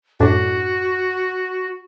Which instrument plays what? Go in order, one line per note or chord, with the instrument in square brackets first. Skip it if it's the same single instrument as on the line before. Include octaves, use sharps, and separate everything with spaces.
[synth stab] F#2 A2 D4 [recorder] F#4